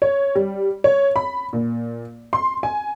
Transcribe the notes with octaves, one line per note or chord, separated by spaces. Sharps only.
C#5
G3
C#5
B5
A#2
C6
G#5